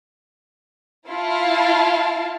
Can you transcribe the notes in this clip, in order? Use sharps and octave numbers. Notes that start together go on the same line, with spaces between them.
E4 F4 F5 A5